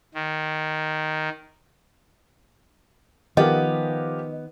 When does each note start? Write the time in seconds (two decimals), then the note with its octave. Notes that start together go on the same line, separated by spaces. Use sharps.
0.14 D#3
3.37 D#3 F3 B3 G4 A#4 D#5